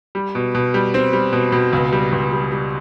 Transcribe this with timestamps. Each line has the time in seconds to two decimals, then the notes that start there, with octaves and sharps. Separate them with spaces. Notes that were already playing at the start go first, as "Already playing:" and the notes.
0.15 G3
0.35 B2
0.55 B2
0.74 G3
0.94 C4
1.13 G3
1.33 B2
1.52 B2
1.73 C#2
1.92 G3
2.12 C#2
2.32 G3
2.52 G3